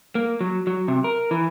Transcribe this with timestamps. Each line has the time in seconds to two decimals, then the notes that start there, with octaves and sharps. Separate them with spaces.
0.15 A#3
0.41 F#3
0.67 F#3
0.88 C3
1.04 A#4
1.31 E3